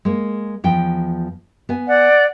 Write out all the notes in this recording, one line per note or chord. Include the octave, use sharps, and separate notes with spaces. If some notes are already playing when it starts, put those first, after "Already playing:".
G#3 A#3
E2 F3 G5
B3 G#5
D5 F#5